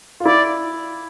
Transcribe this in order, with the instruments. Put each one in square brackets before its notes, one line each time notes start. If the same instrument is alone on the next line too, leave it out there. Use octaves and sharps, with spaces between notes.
[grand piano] F4
[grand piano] E4 [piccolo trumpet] D5